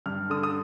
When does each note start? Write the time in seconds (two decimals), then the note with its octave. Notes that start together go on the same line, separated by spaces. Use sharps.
0.06 G2 F6
0.30 D3 D#6
0.43 D#6